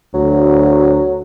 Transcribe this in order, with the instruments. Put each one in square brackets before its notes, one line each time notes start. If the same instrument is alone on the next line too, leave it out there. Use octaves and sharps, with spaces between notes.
[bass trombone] D2 [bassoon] F#3